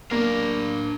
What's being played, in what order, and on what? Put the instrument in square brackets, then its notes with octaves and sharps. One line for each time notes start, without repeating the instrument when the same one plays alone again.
[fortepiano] A#3 [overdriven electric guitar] D4 F5